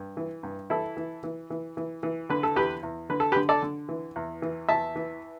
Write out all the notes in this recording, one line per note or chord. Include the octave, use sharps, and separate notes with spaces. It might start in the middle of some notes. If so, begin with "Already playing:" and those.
Already playing: G2
E3
G2
E3 E4 A4
E3
E3
E3
E3
E3
D3 B4
A4
E2 G4 B4
E2
D3 B4
A4
G4 B4
D3
A4 D5
D3
E3
E2
E3
E2 E5 A5
E3